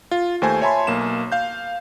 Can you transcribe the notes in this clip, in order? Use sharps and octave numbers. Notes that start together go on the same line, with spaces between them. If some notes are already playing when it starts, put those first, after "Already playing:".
F4
D#2 A3 C5 G#5
C#5 E5 G#5 A5 B5 C6
B1 A#3 E7
F5 G6